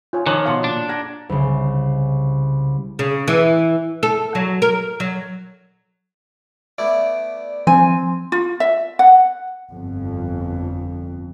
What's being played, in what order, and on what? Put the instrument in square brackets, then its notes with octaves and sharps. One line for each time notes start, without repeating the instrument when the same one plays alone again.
[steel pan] F4 C#5 G#5
[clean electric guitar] D#3 F3 [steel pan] C#5 A#5 D6 [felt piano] A5 D#6 F#6
[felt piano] B2 C#5 C#7 [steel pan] F5 A5 C6
[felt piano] A#2 [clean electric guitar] D4
[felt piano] A#5 G#6 A#6
[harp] C2 C#3
[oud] C#3
E3
A4
F#3
A#4
F#3
[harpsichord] A3 B3 E4 [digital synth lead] D5
[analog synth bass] F3 [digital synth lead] C4 [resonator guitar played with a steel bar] G#5
[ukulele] F4
E5
F#5
[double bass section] G1 F2